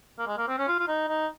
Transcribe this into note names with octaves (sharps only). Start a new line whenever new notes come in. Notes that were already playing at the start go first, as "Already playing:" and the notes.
A#3
G#3
A#3
C4
C#4
F4
F4
D#4
D#4